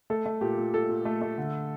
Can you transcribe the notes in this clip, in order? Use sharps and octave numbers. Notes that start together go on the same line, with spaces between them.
A3 A4
A3
A#2 G4
A#2
A#2 A4
A#2
A3
A3
D3